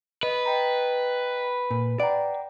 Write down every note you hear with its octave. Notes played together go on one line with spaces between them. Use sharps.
B4 D#5
D#5 G5 A#5
A#2
D5 F#5 G5 A#5